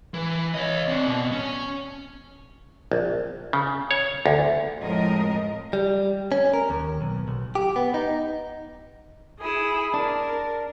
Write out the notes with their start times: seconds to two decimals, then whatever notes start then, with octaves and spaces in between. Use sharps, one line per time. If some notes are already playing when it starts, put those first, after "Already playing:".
0.14 E3
0.54 C#5 D#5
0.88 C4 D4
1.07 B2
1.32 C#4
2.92 A#1
3.53 C#3
3.91 C#5
4.26 D2
4.81 F2 A2 F3 G#3 A#4 D#5
5.73 G3
6.32 C#4
6.54 A#4
6.70 D#2
7.01 B1
7.28 B1
7.55 G4
7.76 B3
7.94 D#4
9.40 E4 G#4
9.94 D4 A#4